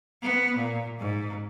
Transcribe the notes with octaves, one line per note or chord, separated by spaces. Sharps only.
B3
A#2
G#2